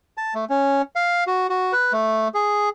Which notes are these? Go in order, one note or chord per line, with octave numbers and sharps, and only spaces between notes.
A5
A3
C#4
F5
F#4
F#4
B4
A3
G#4